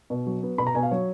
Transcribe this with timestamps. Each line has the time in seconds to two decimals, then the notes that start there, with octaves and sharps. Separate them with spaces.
0.10 B2
0.27 F#3
0.43 B3
0.58 B2 B5
0.67 A#5
0.75 B2 G#5
0.83 F5
0.91 F#3 C#5